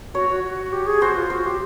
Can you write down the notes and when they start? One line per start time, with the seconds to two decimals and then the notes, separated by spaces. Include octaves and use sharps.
0.14 F#4 C#5
0.29 F#4
0.43 F#4
0.72 G4
0.87 G#4
1.02 F#4 C5
1.17 F4
1.30 F#4 C5
1.45 G4